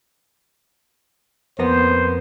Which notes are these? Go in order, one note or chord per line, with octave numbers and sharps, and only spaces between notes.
F2 A#3 B3 C5